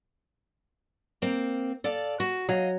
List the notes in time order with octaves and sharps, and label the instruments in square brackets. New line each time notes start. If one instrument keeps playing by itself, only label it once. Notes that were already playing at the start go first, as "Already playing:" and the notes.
[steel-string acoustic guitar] A#3 C4
A4 D5 F5
F#4
[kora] F#3 [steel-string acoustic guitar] D#5 F5